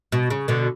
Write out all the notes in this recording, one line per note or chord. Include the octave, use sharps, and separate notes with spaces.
B2
C#3
B2 D3